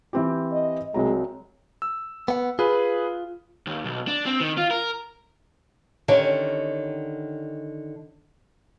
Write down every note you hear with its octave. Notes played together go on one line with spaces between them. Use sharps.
E3 C4 G4
D#5
C2 F#3 G#3 A#5
E6
B3 F#5
F4 G#4 B4
D#2
B1
D4
C4
D#3
F4
A#4
D3 D#3 C#4 G4 C#5